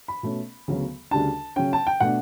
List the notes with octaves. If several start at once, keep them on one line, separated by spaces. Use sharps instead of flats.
B5
B2 A3 C#4
D2 C#3 F#3 B3
D2 C#3 G3 D4 A5
C#3 F#3 C#4 G5
A5
G5
B2 A3 D4 F#5